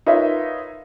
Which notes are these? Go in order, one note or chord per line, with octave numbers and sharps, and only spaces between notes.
D#4 F4 A#4 B4 C#5 E5